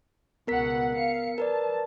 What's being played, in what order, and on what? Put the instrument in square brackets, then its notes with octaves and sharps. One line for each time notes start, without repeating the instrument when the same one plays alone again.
[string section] C#2 B2 F#5 [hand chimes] B3 A#4 B6
[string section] F5 C#7
[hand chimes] A#4 B4 D5 [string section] A5